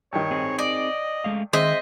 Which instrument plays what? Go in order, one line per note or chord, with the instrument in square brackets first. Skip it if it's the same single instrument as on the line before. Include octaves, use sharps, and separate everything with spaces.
[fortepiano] G2 D#3 [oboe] C#5
[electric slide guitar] C4 D#4 G#4
[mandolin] D5 [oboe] D#5
[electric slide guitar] G#3 A3 F5
[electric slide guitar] D#3 [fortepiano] G#3 C4 [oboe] C5 [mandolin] D#5 E5